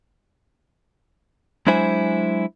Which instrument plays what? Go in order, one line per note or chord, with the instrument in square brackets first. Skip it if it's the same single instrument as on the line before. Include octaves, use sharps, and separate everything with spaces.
[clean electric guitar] F#3 G#3 D4 E4 C5 G#5